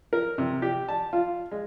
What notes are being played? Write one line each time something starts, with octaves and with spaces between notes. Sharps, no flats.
A#4
C3
G4
A5
F4
G#3